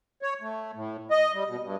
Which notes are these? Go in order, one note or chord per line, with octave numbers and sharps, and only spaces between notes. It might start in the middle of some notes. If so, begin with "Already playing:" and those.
C#5
A3
A2
D#5
G3
B2
G2